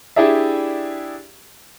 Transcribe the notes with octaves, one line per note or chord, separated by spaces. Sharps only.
D4 E4 G4 G#4 D5 E5